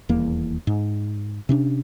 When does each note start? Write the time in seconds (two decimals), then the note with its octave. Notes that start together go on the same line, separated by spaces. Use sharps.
0.09 D#1 E2 A#3
0.67 G#2
1.49 C3 C#4 D4